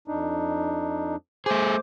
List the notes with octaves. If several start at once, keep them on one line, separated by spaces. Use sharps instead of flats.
F2 D4 D#4
A3 G#4 C5 D6